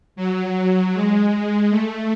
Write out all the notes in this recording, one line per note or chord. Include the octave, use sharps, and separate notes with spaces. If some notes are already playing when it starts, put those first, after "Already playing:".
F#3
G#3
A3